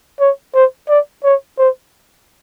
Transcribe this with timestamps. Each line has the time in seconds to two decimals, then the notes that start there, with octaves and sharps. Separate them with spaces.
0.20 C#5
0.54 C5
0.89 D5
1.24 C#5
1.59 C5